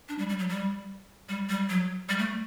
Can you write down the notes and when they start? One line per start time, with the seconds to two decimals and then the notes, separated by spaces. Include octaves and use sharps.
0.09 D4
0.19 G3
0.29 G3
0.39 F#3
0.49 G3
1.29 G3
1.49 G3
1.69 F#3
2.09 G3
2.19 A3